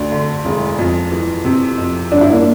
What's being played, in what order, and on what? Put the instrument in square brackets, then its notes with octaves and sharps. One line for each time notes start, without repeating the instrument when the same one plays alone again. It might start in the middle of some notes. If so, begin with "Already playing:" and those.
Already playing: [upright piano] D2 [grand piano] D4
[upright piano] D3
E1
F2
E3
C3
F2
[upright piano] G1 [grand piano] D4
[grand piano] E4
A#3 D4